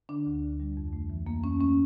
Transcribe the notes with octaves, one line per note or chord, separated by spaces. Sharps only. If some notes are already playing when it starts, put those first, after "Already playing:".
D3 D4
D2
D2
G3
F2
A3
E3
F2 A#3
F2 C#4
A3 C#4